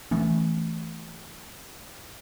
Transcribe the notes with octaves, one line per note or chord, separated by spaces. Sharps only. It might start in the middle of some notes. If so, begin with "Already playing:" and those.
E3 A3 B3 C#4